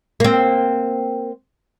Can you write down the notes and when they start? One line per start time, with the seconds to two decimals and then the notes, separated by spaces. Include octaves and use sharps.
0.20 A#3 C4